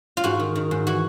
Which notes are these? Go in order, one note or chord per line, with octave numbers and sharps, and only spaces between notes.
F4
G#2 F#4
D#3
D#3
G#2
E3 F#4